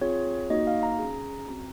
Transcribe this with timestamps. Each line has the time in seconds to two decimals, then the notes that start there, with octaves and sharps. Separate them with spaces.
0.01 C4 F4 G#4 C#5
0.50 A#3 D#4 F#4 D#5
0.67 F5
0.83 A#5
0.99 C#4 G#4
1.48 C4 F#4 A#5